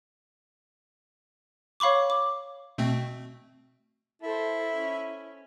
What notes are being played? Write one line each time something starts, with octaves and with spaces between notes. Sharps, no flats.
C#5 F5 B5 C#6 D6
D6
B2 A3 C4
E4 A4 C5
C#4